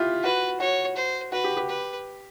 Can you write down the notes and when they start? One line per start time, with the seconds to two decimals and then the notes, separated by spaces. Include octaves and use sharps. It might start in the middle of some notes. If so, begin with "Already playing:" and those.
Already playing: E4 F4 G4
0.23 F#4 B4
0.60 F#4 C#5
0.96 C5
1.32 F#4 B4
1.44 G4
1.57 G4
1.69 B4